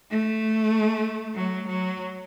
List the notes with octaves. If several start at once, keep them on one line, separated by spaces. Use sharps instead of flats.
A3
F#3
F#3